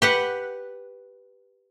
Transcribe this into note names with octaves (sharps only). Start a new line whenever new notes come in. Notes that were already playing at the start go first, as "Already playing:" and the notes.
G4 B4 F#5